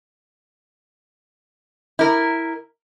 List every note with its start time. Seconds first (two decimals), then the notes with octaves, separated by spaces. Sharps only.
1.99 E4 A#4